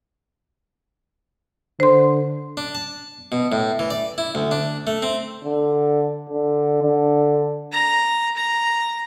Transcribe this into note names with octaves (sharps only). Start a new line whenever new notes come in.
D3 C5 C6
D4
A5
B2
A2
E3
D5
E4
D2
D4
A3
C4
D3
D3
D3
A#5
A#5